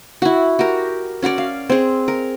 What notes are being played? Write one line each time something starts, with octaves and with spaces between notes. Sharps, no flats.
E4 F#4
F#4 G4 A#4
C#4 F#4 C#5 D5
F5
C4 G#4
A#4